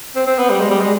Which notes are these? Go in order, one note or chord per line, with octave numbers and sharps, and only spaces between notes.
C4
C4
B3
G3
G#3
G3
G#3